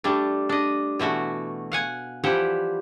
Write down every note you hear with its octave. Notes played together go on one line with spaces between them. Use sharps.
G3 A3 D4
D4 D#5
B2 E3 A3 F#4
F5 F#5 G#5
E3 F3 G3 E4 G4 F#5